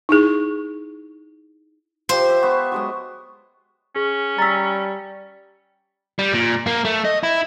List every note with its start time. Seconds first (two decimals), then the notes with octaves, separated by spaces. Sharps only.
0.09 D#4 E4 G#4
2.09 F3 G4 C5
2.29 E5
2.43 B3 C#6
2.72 F#3 G#3 D#5
3.96 C#4 G#4
4.38 G3 A#5 E6 A6 B6
6.19 G3
6.33 A#2
6.67 A#3
6.85 A3
7.05 D#5
7.23 E4